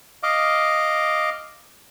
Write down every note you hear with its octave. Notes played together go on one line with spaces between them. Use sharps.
D#5 F5 D6